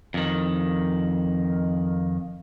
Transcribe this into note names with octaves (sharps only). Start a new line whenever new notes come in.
F2 D#3